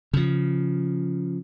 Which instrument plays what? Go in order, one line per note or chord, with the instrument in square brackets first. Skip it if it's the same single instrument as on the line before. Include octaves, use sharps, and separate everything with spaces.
[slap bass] C#3 F3